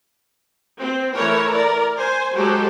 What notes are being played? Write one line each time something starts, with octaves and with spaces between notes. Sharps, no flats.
C4
E3 A3 E4 A#4 C#5
A#4 D5
C5 G#5
F#3 G#3 F#4 G4 A4 C5